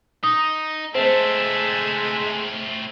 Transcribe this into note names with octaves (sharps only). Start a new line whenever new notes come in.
D#4 D#6
G#3 A3 C4 C5 E5 A5